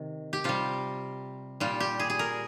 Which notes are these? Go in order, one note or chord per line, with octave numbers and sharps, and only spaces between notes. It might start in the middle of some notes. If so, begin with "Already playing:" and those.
Already playing: C3 D#3
G4
C3 G3 F4
A#2 G3 F4
G4
G#4
G#4
A#4